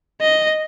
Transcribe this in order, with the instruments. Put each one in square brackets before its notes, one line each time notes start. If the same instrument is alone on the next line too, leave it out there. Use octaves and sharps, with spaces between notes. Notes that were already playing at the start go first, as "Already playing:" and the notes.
[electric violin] D#5